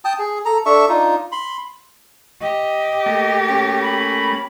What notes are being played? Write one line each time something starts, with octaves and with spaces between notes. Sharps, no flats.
G5 A5 D#6
G#4
A4 A#5
D4 A4 E5 C#6
D4 D#4 F4
B5 C6
G4 D#5
A3 A#3
C#4
B5